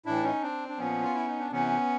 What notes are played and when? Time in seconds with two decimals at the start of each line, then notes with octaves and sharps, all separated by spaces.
0.05 A2 E3 D4 E4
0.23 C#4 D#4
0.42 C4 D4
0.68 D4
0.78 A#2 F3 B3 C#4
1.03 F4
1.14 E4
1.27 D#4
1.39 D4
1.52 C3 E3 B3 C#4